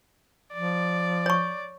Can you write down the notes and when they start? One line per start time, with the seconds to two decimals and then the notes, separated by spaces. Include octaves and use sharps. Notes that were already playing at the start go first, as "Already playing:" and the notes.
0.53 F3 D5
1.26 C#5 C#6